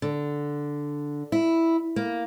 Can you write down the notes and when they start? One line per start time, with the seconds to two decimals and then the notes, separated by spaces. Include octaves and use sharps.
0.02 D3
1.32 E4
1.96 A#3